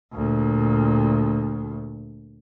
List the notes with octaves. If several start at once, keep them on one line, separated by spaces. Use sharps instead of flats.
D2 A#2